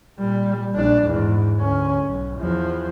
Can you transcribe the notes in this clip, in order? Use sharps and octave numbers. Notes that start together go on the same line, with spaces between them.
A#2 G3
A#1 D4
E2 G#2
D2 C#4
B1
E2 F3